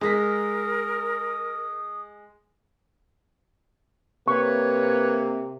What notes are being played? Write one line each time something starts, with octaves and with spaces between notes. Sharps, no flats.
G#3 A#4 D#6 A#6 B6
C3 A#3 B4 C#5 C#6